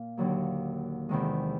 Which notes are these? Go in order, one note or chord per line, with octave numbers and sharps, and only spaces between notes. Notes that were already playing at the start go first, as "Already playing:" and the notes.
Already playing: A#2 F5
D#2 D3 F#3 A#3
E2 C3 D#3 G#3